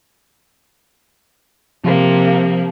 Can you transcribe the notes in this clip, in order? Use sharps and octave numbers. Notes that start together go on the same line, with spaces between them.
C3 F3 A#3